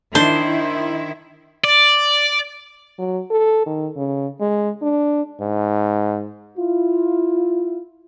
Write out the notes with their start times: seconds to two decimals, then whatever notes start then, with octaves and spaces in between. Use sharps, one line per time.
0.15 D#3 D4 E4 C5
1.64 D5
2.99 F#3
3.31 A4
3.66 D#3
3.97 C#3
4.40 G#3
4.82 D4
5.41 G#2
6.58 E4 F4